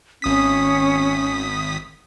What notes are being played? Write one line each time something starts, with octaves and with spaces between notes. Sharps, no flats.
G#1 C#4 D#6 B6